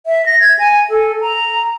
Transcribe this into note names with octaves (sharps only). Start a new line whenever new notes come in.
E5
A#6
G#6
G#5
A4
A#5